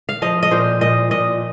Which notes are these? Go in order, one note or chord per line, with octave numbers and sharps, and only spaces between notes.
F5
F3 D#5
D#5
A#2 C5
A#2 D#5
A#2 D#5